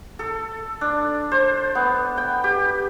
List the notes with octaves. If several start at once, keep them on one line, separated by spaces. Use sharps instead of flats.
A4
D4
C5
B3
G5
G4